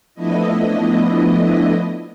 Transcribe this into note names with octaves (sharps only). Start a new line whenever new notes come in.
F3 A3 B3 D4 E4 D#5